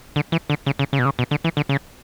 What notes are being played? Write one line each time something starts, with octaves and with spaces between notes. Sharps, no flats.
D3
E3
D3
C#3
C#3
C#3
B2
C#3
B2
D3
E3
D3
C#3